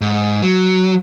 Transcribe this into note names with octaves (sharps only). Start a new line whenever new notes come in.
G#2
F#3